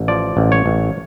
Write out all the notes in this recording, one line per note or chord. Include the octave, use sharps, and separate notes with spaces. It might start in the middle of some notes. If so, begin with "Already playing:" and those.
Already playing: A1
F3 D5
A1
C#5
A1